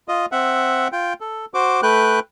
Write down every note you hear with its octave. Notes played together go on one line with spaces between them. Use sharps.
F4 D#5
C4 E5 F#5
F4 G5
A4
F#4 C5 D6
A3 B4 G5 F#6